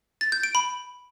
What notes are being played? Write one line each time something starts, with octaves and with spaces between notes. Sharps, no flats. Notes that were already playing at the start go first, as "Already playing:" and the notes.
A6
G6
D7
B5